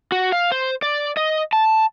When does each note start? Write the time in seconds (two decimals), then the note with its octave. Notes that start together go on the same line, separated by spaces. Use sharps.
0.12 F#4
0.32 F5
0.52 C5
0.82 D5
1.17 D#5
1.53 A5